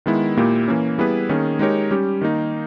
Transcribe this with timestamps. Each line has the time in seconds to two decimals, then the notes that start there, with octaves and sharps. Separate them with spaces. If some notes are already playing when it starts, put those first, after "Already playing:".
0.06 D#3 G#3 B3 E4
0.37 A#2 A#3 E4 G4
0.68 E3 A#3 C#4
0.98 G3 B3 E4 G#4 B4
1.29 D#3 A#3 C#4 G#4
1.59 G#3 D#4 G4 A#4 C#5
1.91 G3 C#4 G4
2.21 D#3 A#3 D#4